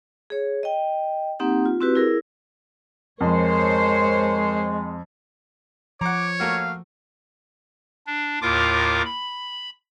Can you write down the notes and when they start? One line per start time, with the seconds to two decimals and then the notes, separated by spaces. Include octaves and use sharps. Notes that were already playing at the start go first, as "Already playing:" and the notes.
0.30 G#4 C#5
0.63 D#5 G5
1.40 A#3 C4 D#4 G4 F#5
1.65 F4
1.81 C4 E4 F#4 G4 B4
1.95 E4 G#4 A#4
3.21 F2 G#3 A#4 C5 C#5
6.01 F3 C#5 F#5 A#5 D6
6.40 A3 A#3 F#4 F5
8.07 D4
8.42 D#2 A2 F4 A#4 D6
9.05 B5